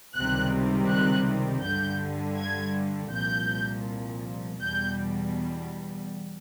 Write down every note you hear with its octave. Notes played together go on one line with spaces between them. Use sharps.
C#2 C3 D#3 G3 F#6
F#6
G2 D3 G3 G6
G#6
C2 A#2 F3 G6
E2 B2 G3 G6